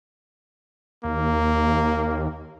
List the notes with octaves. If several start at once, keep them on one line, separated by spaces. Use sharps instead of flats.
D#2 A#3